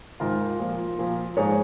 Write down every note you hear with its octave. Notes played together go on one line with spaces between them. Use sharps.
G#2 D#3 F4 A#4
A#2 F3
A#2 F3
G#2 F3 G#4 C#5